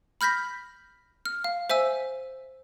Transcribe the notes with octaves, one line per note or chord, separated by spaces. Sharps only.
B5 F6 G6 A#6 B6
F6
F5
C5 E5 G#5 E6